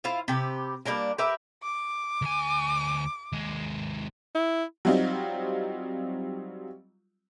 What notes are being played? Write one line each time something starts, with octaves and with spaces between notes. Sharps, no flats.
E4 F4 C5 F5
C3 G4 B4
G3 A#3 D4 A#4
G4 A#4 B4 E5
D6
D2 G#5
D#2 G#3
E4
F#3 G3 C4 D#4 F4